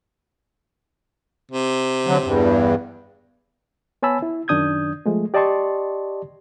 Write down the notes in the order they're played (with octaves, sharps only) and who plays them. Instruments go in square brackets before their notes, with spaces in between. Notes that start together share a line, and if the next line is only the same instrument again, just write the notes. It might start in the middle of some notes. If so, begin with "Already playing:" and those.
[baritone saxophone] C3
[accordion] D3 F#3
E2 G2
[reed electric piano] B3 C#5 G#5 A5 B5 E6
E4
F#2 D#3 D4 D#6 G6 G#6
F3 G#3 A3
G4 D5 D#5 A5 C6 C#6